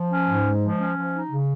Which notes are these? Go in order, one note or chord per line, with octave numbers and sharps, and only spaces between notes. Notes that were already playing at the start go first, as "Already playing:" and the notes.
Already playing: F3
C#4
G#2
G#3
F3
C#4
F3
D#4
C#3